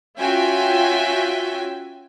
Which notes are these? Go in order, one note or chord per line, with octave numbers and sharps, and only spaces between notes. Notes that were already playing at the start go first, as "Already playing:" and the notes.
C#4 F4 F#4 E5 G5 G#5